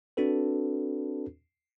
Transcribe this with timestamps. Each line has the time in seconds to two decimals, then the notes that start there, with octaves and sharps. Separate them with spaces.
0.17 C4 D4 F#4 A4 B4